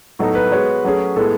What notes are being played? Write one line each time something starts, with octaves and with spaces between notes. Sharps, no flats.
A2 F#3 B3 D#4 A4
B4
G#3 B3 F#4 C#5
F#3 A3 C#4 G#4
A2 G#3 B3 E4 A4